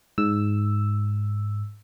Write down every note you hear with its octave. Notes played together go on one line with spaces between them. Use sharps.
G#2 E6